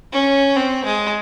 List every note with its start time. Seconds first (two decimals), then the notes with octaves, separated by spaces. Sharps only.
0.12 C#4
0.56 C4
0.85 G#3